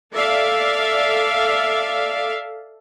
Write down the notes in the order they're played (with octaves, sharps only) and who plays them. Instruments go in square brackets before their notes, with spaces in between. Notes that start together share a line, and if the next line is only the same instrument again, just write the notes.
[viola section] A4 D5 E5 F5